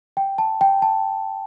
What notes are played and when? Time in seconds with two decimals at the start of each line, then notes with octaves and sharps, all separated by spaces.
0.17 G5
0.38 A5
0.61 G5
0.82 A5